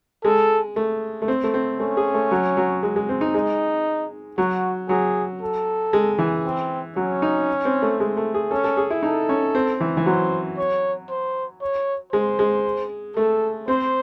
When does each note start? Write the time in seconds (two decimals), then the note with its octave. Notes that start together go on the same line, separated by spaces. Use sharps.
0.24 G#3 A4
0.76 A3
1.22 A3
1.28 C4
1.44 A3
1.54 C4
1.79 A3 C#4
1.97 G#4
2.14 A3
2.31 F#3
2.57 F#3
2.83 G#3
2.96 G#3
3.09 C4
3.21 D#4
3.34 G#3 D#4
4.38 F#3 F#4
4.89 F#3 G#4
5.41 A4
5.93 G#3
6.18 E3
6.45 C4
6.96 F#3 C#4
7.22 D#4
7.65 C4
7.82 A3
8.00 G#3
8.17 A3
8.34 G#4
8.51 C#4 A4
8.64 A4
8.77 G#4
8.90 E4
9.03 D#4 A4
9.29 C#4
9.55 C4
9.80 E3
9.97 E3
10.06 F#3 C5
10.57 C#5
11.10 C5
11.61 C#5
12.12 G#3 C5
12.39 G#3
13.17 A3 A4
13.68 C4 C5